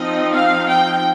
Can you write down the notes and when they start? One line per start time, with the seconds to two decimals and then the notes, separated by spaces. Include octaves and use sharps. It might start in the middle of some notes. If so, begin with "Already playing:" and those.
Already playing: F3 C4 D#4 D#5
0.32 F5
0.68 G5